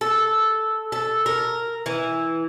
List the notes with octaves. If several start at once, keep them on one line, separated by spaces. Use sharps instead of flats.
A4
A4
A#4
E3